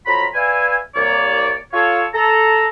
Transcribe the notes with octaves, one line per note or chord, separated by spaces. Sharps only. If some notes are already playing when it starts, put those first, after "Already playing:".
F2 F#3 F4 A#5 B5
B4 D5 E5 F5 G#5
C2 A#3 C#5 D5
F4 A4 C#5
A4 A#5